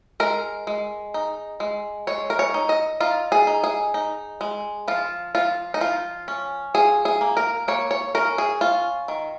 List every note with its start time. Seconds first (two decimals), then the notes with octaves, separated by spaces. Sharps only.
0.20 G#3 A#4
0.67 G#3
1.14 D#4
1.60 G#3
2.07 G#3 C#5
2.30 A#4
2.39 C#5
2.54 D#4
2.69 D#5
3.00 D#4 F4
3.32 G#4
3.47 D#4
3.64 G#4
3.94 D#4
4.41 G#3
4.88 F3 F4
5.35 F3 F4
5.74 D#4
5.81 F3 F4
6.28 C#4
6.74 F3 G#4
7.05 G#4
7.21 A#3
7.37 A#4
7.68 A#3 C#5
7.91 C#5
8.15 C#4 A#4
8.38 G#4
8.61 C#4 F4
9.08 D#3